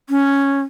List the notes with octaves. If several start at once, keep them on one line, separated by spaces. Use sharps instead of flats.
C#4